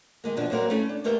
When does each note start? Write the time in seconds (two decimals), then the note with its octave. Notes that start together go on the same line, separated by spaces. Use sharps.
0.24 D#3 G#3 A#3
0.37 F#2 B2 F3 D4
0.50 F#3 G3 A#3 C4 F#4 A#4
0.70 A3 C#4 E4
0.89 D4
1.04 E2 A3 A#3 G4 A#4 C5